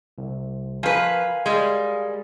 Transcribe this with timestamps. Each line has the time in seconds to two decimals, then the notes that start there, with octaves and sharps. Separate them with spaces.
0.18 C2
0.83 F3 A#4 B4 F5 G#5
1.46 G3 G#3